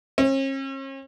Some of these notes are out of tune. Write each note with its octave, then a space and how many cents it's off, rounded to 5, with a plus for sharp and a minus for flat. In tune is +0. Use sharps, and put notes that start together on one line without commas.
C#4 -45